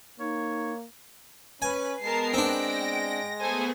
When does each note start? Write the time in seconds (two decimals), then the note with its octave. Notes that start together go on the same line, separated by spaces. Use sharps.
0.20 A#3 D#4 C#5
1.62 C#4 B4 G#5
2.02 G#3 B3 A#4 A5 C7
2.34 C4 D4 G5 A#6 D7
3.40 A3 B3 G#4 A4 C5 G#5